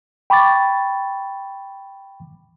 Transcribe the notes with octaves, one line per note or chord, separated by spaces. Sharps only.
G5 B5 C#6 D6 A6